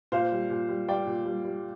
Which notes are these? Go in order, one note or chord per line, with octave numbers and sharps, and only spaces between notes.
A#2 C5 F5
G3
A#2
G3
G3 D5 G5
A#2
G3
G3